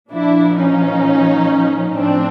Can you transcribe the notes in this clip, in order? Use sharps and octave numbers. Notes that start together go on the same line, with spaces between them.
A#2 F3 D4 E4
C#4 D#4
A2 F3 C4 D4